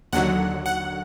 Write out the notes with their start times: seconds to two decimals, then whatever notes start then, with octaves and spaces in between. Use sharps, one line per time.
0.13 D#2 D3 F#3 F#5
0.66 F#5